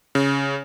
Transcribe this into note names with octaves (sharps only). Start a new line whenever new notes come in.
C#3